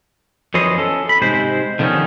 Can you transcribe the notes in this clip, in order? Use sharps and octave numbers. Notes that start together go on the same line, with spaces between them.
F#2 E3 F3 C#5 D#5 C6
C#4 A4
B5
G#2 C3 G#3 C5
D3 D#3 F3 C4 C#4 D#4